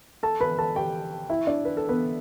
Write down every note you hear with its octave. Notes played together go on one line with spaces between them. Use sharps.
A4 A5
B4 B5
A4 A5
G4 G5
E4 E5
D4 D5
B4
A4
B3 B4